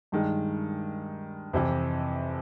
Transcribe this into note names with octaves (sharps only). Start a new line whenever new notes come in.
G2 D#3 G#3
F2 C3 E3